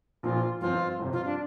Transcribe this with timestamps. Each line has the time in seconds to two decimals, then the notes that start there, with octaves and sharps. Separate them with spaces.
0.23 A#1 A#2 F3 F4
0.61 G1 F2 F3 C4 F4
0.99 G1 F2 C3 F3
1.13 F4
1.25 D4